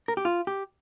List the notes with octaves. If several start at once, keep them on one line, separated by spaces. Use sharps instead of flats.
A#4
G4
F4
G4